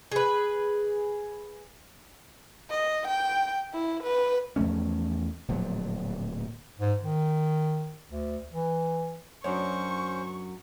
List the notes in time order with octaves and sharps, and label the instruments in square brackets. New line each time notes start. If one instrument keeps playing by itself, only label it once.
[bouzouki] G#4 B4
[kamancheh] D#5
G5
E4
B4
[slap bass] E2 F3 A3 C#4
D1 A#2 F3 F#3
[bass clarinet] G#2
D#3
D2
E3
[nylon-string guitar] F#2 F#3 D4 [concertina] C#4 C5 [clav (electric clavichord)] C#5 [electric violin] C#6